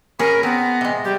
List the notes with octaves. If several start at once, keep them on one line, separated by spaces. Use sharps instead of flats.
C#4 G#4 A#4 F#5 B5
B3 C4 A#5
C3 G#3
G3 G4